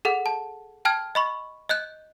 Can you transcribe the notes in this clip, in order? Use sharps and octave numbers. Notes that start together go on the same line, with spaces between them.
G#4 A4 F#5
A5
G5 A5 F6 G#6
D#5 B5 C#6
D#5 F#6 G6